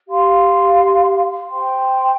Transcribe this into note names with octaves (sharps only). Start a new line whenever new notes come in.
G4 F5 C6
C5 G5 C6